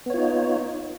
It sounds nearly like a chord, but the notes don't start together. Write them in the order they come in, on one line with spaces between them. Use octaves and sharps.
B3 C#5 F4 D#4